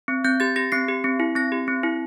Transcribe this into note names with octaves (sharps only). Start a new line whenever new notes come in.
C4
C4 G6
G4 A6
G4 A#6
C4 C7
G4
C4
E4
C4 A#6
G4
C4
E4